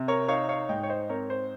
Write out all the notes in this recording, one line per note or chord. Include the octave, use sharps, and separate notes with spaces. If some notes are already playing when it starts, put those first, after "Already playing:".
Already playing: C3
A#4 C#5
D#4 C#5 F5
C#5 F5
G#2 D#5 G5
C#5
C5 D#5
C4 A#4 C#5
C5